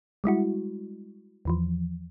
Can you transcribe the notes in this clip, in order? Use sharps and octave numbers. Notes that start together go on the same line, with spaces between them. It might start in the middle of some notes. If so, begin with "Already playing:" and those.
G3 G#3 E4 F#4
E2 E3 F3